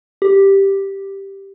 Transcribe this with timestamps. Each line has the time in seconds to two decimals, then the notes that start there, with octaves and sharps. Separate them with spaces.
0.22 G4